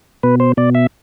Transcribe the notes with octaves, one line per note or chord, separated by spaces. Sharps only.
B2 B4
C5
B2 D5
E5